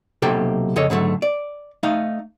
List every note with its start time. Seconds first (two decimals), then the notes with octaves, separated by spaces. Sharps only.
0.22 B1 C3 A#3 G4 A4 G5
0.76 F2 C#3 A4 C#5 D#5
0.90 G#2 D3 F#3 A3
1.22 D5
1.83 A3 D#4 F5